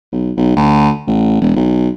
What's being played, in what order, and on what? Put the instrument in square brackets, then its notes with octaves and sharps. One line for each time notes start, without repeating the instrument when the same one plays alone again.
[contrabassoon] B1
B1
D2
A1
E1
B1